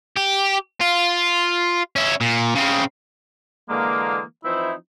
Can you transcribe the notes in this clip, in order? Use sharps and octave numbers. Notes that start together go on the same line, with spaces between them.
G4
F4
C#4 E4
A#2
C#3 C4
D3 E3 G#3 A#3
E3 F3 C4 D#4 E4